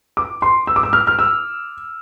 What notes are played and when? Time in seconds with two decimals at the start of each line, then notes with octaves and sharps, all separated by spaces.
0.17 D6
0.42 C6
0.67 E6
0.76 D6
0.83 E6
0.93 F6
1.07 F6
1.19 E6